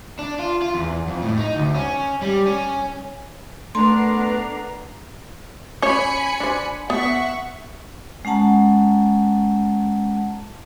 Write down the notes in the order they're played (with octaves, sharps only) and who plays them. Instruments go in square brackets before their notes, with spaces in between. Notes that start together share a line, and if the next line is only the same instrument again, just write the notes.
[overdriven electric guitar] D4
F4
F4
E2
F2
A2
D#4
D2
C#4
G3
C#4
[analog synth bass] A3 [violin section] B3 A#4 C7 [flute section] D4 A#5 [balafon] C6
[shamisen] C#4 C#5 [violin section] G#5 B5 C#7
[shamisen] D4 C5
[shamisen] B3 [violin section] E5 F#5 C#6
[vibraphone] G#3 C#4 F#5 A5 A#5